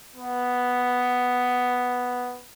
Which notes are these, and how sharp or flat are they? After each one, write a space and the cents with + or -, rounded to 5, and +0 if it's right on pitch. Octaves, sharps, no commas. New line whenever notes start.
B3 +0